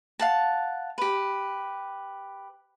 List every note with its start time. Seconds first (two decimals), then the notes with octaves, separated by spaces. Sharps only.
0.19 F5 F#5 A5
0.98 G4 B4